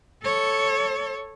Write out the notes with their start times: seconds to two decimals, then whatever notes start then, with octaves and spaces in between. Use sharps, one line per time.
0.23 A4 C#5